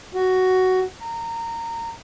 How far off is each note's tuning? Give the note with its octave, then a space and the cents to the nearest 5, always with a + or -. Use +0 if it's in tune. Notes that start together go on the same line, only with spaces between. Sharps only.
F#4 +10
A#5 -20